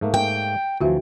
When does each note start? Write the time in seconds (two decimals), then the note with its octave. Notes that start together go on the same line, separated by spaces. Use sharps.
0.01 G#2 A3 A#3
0.14 G5
0.81 D2 E3 F3 F4 F#4 E5